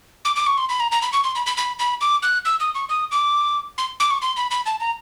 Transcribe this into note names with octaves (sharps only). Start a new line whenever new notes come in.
D6
D6
C#6
C6
B5
A#5
A#5
B5
C#6
C6
B5
B5
B5
B5
D6
F#6
E6
D#6
C#6
D#6
D6
C6
D6
C#6
C6
B5
B5
A5
A#5